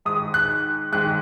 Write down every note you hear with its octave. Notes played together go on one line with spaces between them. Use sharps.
G#2 D#3 D#6
F#6
G#2 D#3 F#6